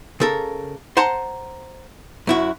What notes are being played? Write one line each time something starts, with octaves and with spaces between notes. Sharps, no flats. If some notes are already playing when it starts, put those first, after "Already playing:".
C#3 A4 A#4
C5 F#5 A5 A#5 C6
F#2 E4 F#4